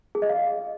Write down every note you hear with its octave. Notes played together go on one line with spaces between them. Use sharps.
G#4
D#5
F5